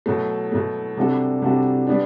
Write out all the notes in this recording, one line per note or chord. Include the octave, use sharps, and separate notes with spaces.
B2 F#3 A3
B2 F#3 A3
C3 G3 D4 F#4 A4
C3 G3 D4 F#4 A4
G3 B3 D4